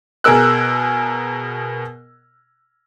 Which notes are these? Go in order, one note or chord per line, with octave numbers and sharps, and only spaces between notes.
B2 G#4 A#4 E6 F#6